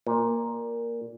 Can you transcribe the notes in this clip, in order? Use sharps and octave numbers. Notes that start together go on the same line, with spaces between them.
A#2